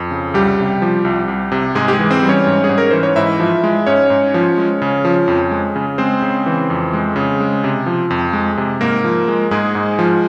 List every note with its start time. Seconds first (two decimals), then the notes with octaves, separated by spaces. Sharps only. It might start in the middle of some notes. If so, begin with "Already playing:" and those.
Already playing: F2
0.11 C#3
0.34 C2 G3 G4
0.59 C3
0.82 F3
1.05 C2
1.28 C2
1.52 C3
1.75 G#2 G#3 G#4
1.88 G4
1.93 G#3 G#4
1.99 E3
2.11 C4 C5
2.22 G3
2.29 C#4 C#5
2.47 G#2
2.64 G#4
2.69 G#2
2.78 A#4
2.91 E3 C5
3.03 C#5
3.16 G#2 E4 E5
3.39 F3
3.64 G#3
3.87 G#2 C#4 C#5
4.10 G#2
4.34 F3
4.58 G#3
4.82 C#3
5.05 F3
5.28 F2
5.51 G#3
5.76 C#3
5.98 G#3 C4 C5
6.22 C#3
6.46 E3
6.70 F2
6.93 G#3
7.16 C#3
7.40 G#3
7.64 C3
7.86 F3
8.10 F2
8.33 G#3
8.57 C3
8.81 G#2 A#3 A#4
9.04 F3
9.28 G#3
9.51 G#2 G#3 G#4
9.75 G#2
9.99 F3